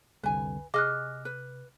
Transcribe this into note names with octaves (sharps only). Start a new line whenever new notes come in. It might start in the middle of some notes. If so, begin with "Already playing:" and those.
C2 F2 D3 B4 G#5
C3 G#4 D#5 D6 F6 F#6
B4